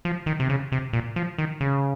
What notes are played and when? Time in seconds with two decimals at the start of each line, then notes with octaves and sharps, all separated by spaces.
0.05 F3
0.26 D#3
0.40 C3
0.49 C#3
0.72 C3
0.93 A#2
1.16 F3
1.38 D#3
1.60 C#3